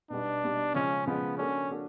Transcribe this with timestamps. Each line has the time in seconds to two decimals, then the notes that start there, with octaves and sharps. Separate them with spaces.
0.10 B2 G3 B3 D4 D#4
0.43 B2 G3 B3 D#4
0.74 C#3 F3 G#3 C#4
1.07 C#3 F3 G#3 B3
1.38 A#3 C#4 D4 F#4 A4
1.71 A#3 D4 F#4 A4